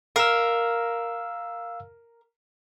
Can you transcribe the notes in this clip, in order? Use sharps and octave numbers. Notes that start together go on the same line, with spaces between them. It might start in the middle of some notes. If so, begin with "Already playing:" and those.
A#4 F5 E6